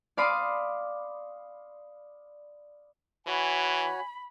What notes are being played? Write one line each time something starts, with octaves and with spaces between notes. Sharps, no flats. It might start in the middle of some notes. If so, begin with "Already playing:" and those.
D5 F5 B5 C6 D6 D#6
E3 F#4 C#5 G#5 B5